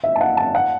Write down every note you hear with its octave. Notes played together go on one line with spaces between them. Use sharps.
E5
A5
F#5
A5
F#5